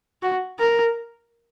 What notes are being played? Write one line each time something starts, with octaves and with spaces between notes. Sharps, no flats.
F#4
A#4